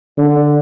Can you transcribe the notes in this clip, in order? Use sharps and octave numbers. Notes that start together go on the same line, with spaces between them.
D3